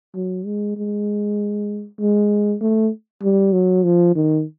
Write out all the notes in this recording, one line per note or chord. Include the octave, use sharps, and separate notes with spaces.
F#3
G#3
G#3
G#3
A3
G3
F#3
F3
D#3